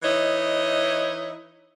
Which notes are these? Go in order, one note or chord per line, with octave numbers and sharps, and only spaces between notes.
E3 D#4 E4 C#5 D#5